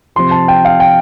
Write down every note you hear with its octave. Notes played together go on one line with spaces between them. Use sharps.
C3 F3 C4 C6
A5
G5
F5
G5